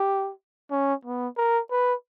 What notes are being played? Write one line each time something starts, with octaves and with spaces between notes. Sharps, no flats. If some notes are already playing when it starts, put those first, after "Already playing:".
Already playing: G4
C#4
B3
A#4
B4